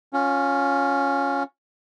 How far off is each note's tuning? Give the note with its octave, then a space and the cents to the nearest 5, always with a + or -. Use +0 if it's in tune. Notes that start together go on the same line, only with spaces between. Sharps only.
C#4 +0 F4 +25